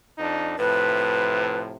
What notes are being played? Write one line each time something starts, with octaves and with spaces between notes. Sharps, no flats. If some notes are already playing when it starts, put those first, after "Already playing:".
F2 D4 D#4
A2 C3 F3 B4